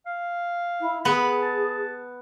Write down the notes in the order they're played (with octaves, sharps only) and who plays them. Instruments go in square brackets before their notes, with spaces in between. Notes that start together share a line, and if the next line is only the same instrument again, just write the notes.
[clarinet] F5
[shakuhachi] E4
[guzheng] B3 [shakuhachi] G#4 [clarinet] B5
[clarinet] A5